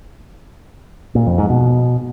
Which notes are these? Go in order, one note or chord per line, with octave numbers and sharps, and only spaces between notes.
A#2
F2
G#2
B2